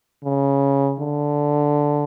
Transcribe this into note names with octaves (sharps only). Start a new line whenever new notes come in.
C#3
D3